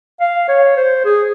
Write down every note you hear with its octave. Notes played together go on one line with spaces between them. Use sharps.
F5
C#5
C5
G#4